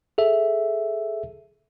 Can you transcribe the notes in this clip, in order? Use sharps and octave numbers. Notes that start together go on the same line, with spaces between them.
G#4 A4 E5